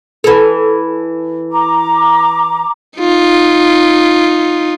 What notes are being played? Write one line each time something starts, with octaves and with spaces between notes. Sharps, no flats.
E3 A4
A#5 D6
D#4 F4